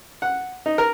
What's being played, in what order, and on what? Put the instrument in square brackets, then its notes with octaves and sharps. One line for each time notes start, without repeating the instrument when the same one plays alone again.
[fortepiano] F#5
D#4
A#4